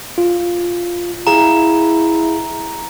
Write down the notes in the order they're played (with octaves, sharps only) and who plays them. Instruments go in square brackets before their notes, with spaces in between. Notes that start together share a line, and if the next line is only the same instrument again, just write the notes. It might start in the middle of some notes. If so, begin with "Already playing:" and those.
[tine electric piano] F4
[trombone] E4 [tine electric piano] G#4 F5 [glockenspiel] A#5